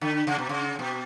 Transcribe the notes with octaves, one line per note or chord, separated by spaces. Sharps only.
D3
C#3
B2
C#3
B2